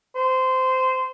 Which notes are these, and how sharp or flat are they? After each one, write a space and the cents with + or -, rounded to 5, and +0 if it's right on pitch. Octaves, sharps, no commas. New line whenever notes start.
C5 -20